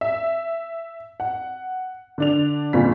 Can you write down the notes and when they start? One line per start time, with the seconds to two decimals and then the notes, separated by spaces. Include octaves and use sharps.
0.01 E5
1.20 F#5
2.18 D3 D4 F7
2.73 G1 A#2 C#3 F4 B6